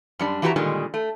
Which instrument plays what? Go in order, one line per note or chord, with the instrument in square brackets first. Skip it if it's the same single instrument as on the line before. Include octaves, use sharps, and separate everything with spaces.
[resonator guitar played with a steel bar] F#2 G3 D4
E3 A3 F#4 G4 E5 A#5
A#2 D3 D#3 G3 G#3
A3